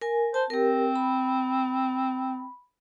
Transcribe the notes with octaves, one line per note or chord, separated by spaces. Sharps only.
A#4 G#5
C5 A5
C4 G4 A#4
B5